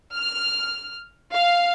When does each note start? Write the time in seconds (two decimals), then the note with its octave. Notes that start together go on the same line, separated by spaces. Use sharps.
0.14 F6
1.33 F5